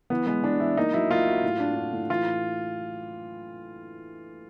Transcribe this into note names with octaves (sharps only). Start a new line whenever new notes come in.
E3 B3
G#3 B3
E3 D4
E3 E4
A#3 D#4
F#3 E4
A#3 F4
F#4
A2
D4
D4
A2
E3 F4